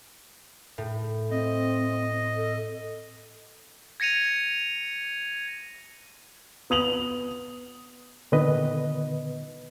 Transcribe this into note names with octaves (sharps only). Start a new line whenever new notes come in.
A2
C4 D#5
A4
G#6 A#6 C#7 D#7 F7
B3 D#6 F7 F#7
A#2 D3 D#3 B3 B4 D#5